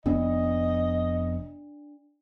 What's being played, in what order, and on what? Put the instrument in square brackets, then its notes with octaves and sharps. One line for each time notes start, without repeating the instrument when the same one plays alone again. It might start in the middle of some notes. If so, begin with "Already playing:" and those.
[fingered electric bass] F1 B3 [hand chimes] D4 [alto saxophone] D#5